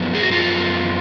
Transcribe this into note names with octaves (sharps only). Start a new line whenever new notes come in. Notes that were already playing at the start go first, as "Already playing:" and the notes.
Already playing: F#2 F3 B3
G#4
F#4
F4